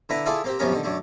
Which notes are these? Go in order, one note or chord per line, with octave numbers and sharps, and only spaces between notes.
D3 E4 B4 A#5
E4 F4 G#4 A4 D5
A#3 C4 G4
C2 F#2 F3 B3 C#4 A#4
D3 D#3
F#2 D3 A3